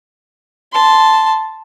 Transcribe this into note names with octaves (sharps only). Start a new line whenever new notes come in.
A5 C6